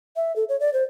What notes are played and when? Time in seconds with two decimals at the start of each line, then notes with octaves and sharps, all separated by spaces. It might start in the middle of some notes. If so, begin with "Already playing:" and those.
0.16 E5
0.36 A4
0.49 C#5
0.60 D5
0.73 C5